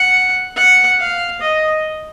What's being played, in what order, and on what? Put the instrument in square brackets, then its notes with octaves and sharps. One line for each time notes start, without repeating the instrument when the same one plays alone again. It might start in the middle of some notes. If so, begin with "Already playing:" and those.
Already playing: [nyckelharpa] F#5
F#5
F5
D#5